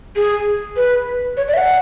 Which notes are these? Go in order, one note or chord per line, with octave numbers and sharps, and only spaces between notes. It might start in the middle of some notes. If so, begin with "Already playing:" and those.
G#4
B4
C#5
D5
E5
F#5